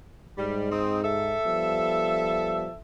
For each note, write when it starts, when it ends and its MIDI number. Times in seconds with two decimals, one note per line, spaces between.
0.38 1.34 44
0.38 0.68 55
0.71 1.02 60
0.71 1.02 63
1.04 2.79 69
1.04 2.79 76
1.44 2.69 53
1.44 2.69 55
1.44 2.69 59